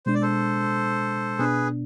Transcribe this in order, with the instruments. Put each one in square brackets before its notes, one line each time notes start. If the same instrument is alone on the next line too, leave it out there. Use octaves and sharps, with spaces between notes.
[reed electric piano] B2 G#3 D4 [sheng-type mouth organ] C5
[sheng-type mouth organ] D5
A4 C5
[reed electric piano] B2 B3 D4 [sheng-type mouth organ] G#4 B4